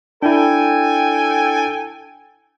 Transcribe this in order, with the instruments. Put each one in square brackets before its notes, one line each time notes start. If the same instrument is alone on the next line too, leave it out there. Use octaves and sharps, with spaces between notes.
[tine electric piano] D4 E4 [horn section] A4 G5 G#5